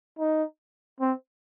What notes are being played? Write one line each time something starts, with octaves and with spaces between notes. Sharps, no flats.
D#4
C4